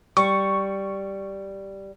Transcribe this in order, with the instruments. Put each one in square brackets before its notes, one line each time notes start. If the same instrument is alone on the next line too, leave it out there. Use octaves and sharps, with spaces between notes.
[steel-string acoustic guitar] G3 [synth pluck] C#6